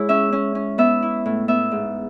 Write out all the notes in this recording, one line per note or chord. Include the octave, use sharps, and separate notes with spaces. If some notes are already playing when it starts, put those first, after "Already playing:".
Already playing: G#3 E4 C#5
C#4 E5
C#4
C#4
B3 E5
E4
A2
B3 E5
G#2